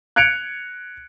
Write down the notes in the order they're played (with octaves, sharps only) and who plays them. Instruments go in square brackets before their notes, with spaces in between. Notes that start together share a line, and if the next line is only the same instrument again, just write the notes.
[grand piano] F#6 G#6 C#7 D7 F7